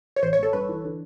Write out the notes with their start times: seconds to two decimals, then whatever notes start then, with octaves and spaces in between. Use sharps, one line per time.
0.16 C#5
0.23 A1 C5
0.33 C#5
0.38 A1 A4
0.53 G2 B4
0.69 E3
0.84 D3